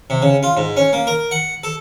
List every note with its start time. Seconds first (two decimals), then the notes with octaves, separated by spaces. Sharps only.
0.10 C3
0.22 C#3
0.43 F4
0.57 G#2
0.77 C#4
0.93 A#3
1.07 A#4
1.31 F#5
1.63 A4